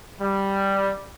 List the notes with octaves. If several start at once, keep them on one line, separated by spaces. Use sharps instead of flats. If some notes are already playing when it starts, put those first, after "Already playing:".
G3